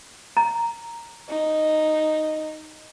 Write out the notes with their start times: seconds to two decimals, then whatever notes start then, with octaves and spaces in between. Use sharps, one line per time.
0.37 A#5
1.29 D#4